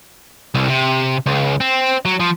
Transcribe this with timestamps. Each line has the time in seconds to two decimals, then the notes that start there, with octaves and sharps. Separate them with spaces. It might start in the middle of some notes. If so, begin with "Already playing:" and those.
0.55 C2
0.68 C3
1.26 C#2
1.61 C4
2.05 F#3
2.20 F3